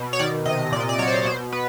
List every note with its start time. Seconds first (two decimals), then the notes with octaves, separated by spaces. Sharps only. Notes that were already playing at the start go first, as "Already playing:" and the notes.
Already playing: B2
0.13 C#5
0.19 D#3 D5
0.46 C3 D#5
0.72 A#2 D5
0.80 D#5
0.89 D5
0.99 F#3 C#5
1.07 C5
1.16 C#5
1.25 B2 C5
1.53 B3 B4